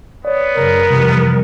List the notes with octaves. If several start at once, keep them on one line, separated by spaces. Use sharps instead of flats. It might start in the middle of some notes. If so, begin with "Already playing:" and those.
B3 C#5 D5
F#2 C#3 A#4
F2 C3 E3 G3